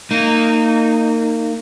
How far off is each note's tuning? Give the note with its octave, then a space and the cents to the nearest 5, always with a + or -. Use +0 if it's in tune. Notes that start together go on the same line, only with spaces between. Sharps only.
A#3 -25 D#4 -10